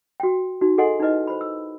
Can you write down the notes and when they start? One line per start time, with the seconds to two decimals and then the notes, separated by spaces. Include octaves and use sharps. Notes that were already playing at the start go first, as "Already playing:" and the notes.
0.20 F#4 G5
0.61 D#4 F#4
0.78 G#4 A4 D#5 F#5 G#5 C6
1.00 D#4 E4 B4 D#5
1.27 C5 B5
1.41 E6